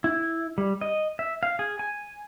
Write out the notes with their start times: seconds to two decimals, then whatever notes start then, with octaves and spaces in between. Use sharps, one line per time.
0.04 E4
0.58 G3
0.81 D#5
1.19 E5
1.43 F5
1.59 G#4
1.79 G#5